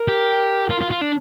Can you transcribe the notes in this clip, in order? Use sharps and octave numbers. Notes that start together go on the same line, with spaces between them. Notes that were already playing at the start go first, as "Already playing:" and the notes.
Already playing: A#4
G4
F4
F4
F4
D4